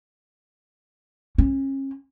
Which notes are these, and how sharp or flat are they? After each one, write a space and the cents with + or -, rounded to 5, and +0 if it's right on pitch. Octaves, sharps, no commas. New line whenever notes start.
C#4 -35